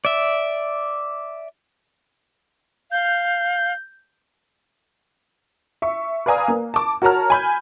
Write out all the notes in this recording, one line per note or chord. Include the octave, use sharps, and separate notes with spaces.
D5 E5
F5 G6
E5 C#6
B4 D5 F5 G#5 A#5 D#6
A#3
A5 D6
F#4 A#4 C#5 A5 A#5 F6
G#5 B5 G6